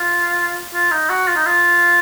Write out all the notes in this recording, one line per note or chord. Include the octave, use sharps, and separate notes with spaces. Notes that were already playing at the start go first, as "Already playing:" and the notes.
Already playing: F4
F4
D#4
F#4
F4
D#4
F4